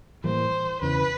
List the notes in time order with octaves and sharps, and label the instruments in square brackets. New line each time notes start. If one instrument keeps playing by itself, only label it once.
[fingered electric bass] A2 E3 G3 A#3 [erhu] C5
[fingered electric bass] E2 C#3 E3 [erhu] B4